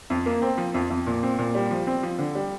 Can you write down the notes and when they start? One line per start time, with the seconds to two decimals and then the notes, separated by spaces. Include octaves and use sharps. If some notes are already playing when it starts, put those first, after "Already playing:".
0.10 F2
0.26 A#3
0.42 C4
0.58 F3
0.74 F2
0.90 F2
1.07 A#2
1.23 C4
1.38 A#2
1.55 G3
1.71 F3
1.87 C4
2.03 F3
2.19 D3
2.35 G3